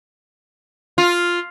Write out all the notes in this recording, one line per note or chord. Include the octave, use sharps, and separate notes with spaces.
F4